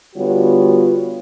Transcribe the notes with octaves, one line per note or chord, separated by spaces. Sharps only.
D3 G3 B3 F4 F#4 C#5